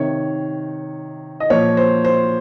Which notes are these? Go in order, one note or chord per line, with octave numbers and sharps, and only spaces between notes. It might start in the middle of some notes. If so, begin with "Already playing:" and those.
Already playing: C3 D#3 C#5
D#5
A#2 F3 C#5
C5
C5